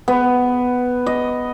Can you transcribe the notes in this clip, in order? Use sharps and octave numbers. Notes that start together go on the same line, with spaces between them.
B3
D#5